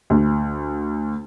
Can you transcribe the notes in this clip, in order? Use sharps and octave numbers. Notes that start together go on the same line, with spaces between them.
D2